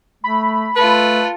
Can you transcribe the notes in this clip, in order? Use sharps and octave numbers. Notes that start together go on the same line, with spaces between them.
A3 B5
A3 F4 A4 B4